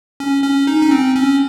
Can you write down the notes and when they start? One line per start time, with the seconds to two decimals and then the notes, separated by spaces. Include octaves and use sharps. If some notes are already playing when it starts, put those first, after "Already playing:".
0.20 C#4
0.43 C#4
0.67 D#4
0.82 C#4
0.91 C4
1.16 C#4